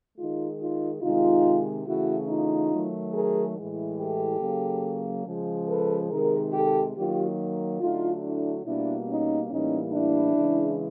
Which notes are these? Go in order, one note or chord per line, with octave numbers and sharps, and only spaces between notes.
D#3 G#3 D#4 F4
D#4 F4
C3 D#3 G#3 D#4 F4
C#3 E3 A3 E4 F#4
D#4 F4
D#3 F#3 A3
G#4 A#4
A2 E3 G#3
G4 A4
C#3 F#3 A#3
C#3 F3 G#3
A4 B4
C3 D#3 G#3 G#4 A#4
G4 A4
D#3 F#3 A#3 F4 G4
D3 F#3 A3 D#4 F4
D4 E4
B2 G3 A#3 D4 E4
C#4 D#4
A2 E3 G3 A#3 C#4 D#4
D4 E4
C#3 E3 G#3